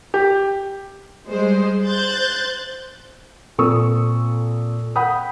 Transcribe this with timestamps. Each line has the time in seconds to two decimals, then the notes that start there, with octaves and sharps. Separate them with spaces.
0.14 G4
1.29 G3 G#3 C5
1.86 C5 F#6 G6 A6
3.58 A#2 C4 A4 C#6 D#6 E6
4.96 F#5 G5 B5 D#6